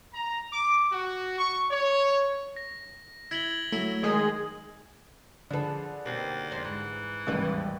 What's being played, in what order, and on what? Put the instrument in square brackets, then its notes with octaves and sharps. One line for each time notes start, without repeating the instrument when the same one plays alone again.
[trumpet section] A#5
D6
F#4
C#6
C#5
[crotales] A#6
[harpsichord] E4 [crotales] G#6 F#7 G7
[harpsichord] F#3 E4 [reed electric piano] A3
[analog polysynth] D#3 G#3 G#4
[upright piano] D3 G#4 B4 [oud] F3 A4
[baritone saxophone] D#2 [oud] B2 C4
[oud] F2 C5
[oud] G#2 [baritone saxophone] E3
[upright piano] A1 D#2 G#2 [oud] C3 G3 B4